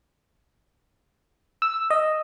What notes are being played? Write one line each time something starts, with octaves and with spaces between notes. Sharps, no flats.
E6
D#5